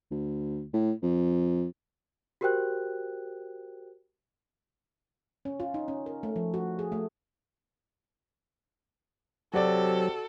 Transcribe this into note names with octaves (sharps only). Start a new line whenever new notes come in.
D2
A2
F2
F#4 G4 A#4 C5 G5 F#6
C#4
F4
D#4
C#4
A#4
A3
F3
F#4
G#4
A3
C3 F#3 F#4 A4 D5